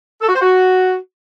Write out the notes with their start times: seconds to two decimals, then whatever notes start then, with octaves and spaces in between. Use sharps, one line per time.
0.21 A4
0.28 F#4
0.35 C5
0.41 F#4